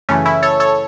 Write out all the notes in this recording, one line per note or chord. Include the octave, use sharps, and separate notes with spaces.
F#2 C#3 E3 A3 C#4
C#4 E4
A4 C#5
A4 C#5